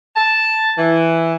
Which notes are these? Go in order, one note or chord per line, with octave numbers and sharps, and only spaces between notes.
A5
E3